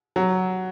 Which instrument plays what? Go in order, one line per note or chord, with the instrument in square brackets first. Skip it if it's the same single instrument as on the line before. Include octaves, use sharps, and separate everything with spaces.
[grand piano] F#3